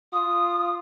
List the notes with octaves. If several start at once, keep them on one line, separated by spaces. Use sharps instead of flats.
F4 D#6